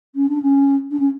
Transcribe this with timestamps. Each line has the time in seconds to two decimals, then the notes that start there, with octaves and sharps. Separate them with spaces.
0.15 C#4
0.29 D4
0.42 C#4
0.90 D4
0.99 C#4